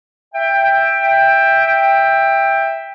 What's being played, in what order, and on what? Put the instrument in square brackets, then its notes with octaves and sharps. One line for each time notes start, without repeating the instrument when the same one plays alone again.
[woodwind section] E5 G5